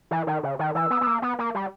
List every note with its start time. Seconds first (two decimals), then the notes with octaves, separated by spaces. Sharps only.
0.11 E3
0.27 D#3
0.43 C#3
0.59 D#3
0.75 E3 E6
0.91 B3
1.01 B3
1.07 A#3
1.22 B3
1.39 A#3
1.55 G3